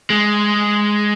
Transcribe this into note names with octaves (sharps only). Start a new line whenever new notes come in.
G#3